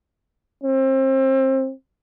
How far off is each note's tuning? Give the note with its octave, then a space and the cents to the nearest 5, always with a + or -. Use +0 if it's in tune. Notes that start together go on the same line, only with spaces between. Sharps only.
C4 +30